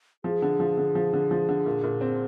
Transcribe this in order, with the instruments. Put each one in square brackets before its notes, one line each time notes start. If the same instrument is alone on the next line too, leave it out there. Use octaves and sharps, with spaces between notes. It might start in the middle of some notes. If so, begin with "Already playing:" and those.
[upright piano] F3 [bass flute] G#4
[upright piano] D3
F3
D3
F3
D3
F3
D3
A#2
A#2
C4